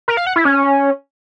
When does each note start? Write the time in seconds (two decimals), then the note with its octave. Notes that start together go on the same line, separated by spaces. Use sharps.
0.08 A#4
0.17 F5
0.27 F#5
0.36 E4
0.45 C#4